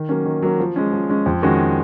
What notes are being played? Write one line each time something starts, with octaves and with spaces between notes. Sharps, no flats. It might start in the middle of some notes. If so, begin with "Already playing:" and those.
Already playing: D#3
F#3 A#3 C#4
D#3
F#3 A#3 C#4
F3
G#3 C#4
F3
G#3 C#4
F2
D#3 G#3 C#4 F#4